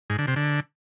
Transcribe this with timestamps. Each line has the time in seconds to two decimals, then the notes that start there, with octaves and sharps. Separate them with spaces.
0.10 G#2
0.19 D3
0.27 C3
0.36 D3